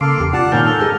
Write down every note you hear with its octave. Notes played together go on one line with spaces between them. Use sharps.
C#3 A#3 A4 F5 C6 D6
E2 G4
C3 F4 D5 F#5 A5
A#2 D#3 C#4 A#4 A5 F6 G6
A4
G4 G#4 A#4 D#5